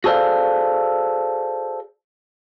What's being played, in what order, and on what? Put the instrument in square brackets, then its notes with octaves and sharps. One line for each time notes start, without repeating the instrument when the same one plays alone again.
[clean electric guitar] F#4 G#4 A4 C5 D5 F5